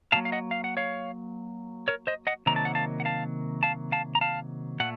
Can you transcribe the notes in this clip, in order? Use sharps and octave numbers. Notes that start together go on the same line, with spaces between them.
A#2 F#3 A#3 F5 A5
F5
D#5 F#5
F5
F#5
C#5 F5
A#4 C#5
C5 D#5
D#5 F#5
C3 D#3 F#3 A#3 A#5
A5
F#5
F5 A5
F#5
F5 A5
F5 A5
F5 A5
A#5
F5 A5
A#2 A3 F#5